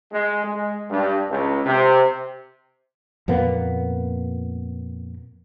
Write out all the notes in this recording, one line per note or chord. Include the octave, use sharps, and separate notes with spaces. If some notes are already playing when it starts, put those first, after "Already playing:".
G#3
G#3
G2
C#2
C3
F2 A#2 A#3 B3